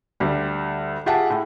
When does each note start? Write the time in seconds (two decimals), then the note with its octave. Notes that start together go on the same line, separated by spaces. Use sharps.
0.20 D2 G3
1.06 F4 G4 G#4 E5 F#5 A5
1.30 A2